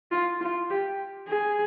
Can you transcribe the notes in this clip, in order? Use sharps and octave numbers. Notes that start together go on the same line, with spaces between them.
F4
F4
G4
G#4